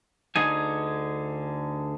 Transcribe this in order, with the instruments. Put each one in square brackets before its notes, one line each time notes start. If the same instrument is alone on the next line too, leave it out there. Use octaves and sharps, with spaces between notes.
[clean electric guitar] D2 D3 D#4 G#4 G#5